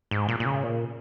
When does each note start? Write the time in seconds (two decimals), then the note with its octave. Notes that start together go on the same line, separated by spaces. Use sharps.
0.11 G#2
0.28 A#2
0.40 A#2
0.46 C#3
0.64 A#2